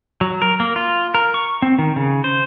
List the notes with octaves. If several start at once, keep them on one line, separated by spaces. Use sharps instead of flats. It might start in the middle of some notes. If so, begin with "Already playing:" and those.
F#3
A#4
A#3
F4
A#4
C#6
C4
D#3
C#3
C5